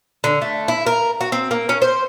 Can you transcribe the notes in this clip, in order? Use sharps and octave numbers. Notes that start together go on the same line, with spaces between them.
D3
A3
E4
A#4
F#4
C4
A#3
C#4
C5